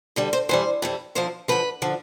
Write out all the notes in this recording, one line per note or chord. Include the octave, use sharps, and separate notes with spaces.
D2 D3 G3
C5
F2 E3 G3 C5
F2 E3 G3
E2 D3 F3 C5
E2 D3 F3 B4
D3 F3